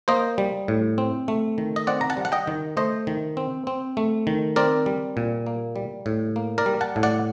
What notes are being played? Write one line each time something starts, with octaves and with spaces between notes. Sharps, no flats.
A#3 C5 D#5
G3
A2
C4
A3
D#3
D#5
C4 D5 F#5
A#5
F#5 A5
G3
F#5
D#5 G5
D#3
A3 C5 D#5
D#3
C4
C4
A3
D#3
C4 A#4 D5
G3
A#2
A#3
G3
A2
A#3
A#4 D5
G3
F#5 A5
A2
D5 F#5